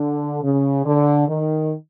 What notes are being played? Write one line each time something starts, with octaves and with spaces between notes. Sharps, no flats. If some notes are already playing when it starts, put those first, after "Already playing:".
Already playing: D3
C#3
D3
D#3